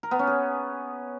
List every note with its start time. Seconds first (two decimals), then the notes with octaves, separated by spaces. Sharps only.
0.03 A#4
0.11 B3
0.19 C#4
0.27 G#4